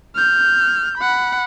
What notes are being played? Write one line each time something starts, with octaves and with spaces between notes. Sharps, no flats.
F6 G6
F#5 B5